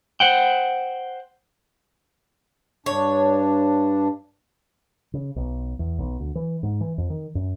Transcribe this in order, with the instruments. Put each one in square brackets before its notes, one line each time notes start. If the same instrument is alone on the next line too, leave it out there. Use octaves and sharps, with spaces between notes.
[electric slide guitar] C5 F#5 G5
[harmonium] G2 D4 [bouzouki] C#5
[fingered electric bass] C#3
B1
E2
B1
D2
E3
G#2
E3
F2
D#3
F#2